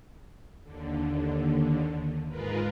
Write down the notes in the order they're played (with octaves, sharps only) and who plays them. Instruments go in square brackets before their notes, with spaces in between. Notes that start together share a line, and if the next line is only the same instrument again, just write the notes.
[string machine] D#2 D3
G#2 G#3 F4 A#4 B4